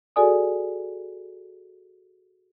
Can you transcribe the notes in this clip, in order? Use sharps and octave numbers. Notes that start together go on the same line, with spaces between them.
F#4 G#4 A4 D5 G#5 D#6